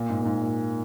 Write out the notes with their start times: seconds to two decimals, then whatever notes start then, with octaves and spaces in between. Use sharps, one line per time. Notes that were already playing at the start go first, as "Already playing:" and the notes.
Already playing: A#2
0.09 G#2
0.21 A#2
0.25 G#2
0.42 A#2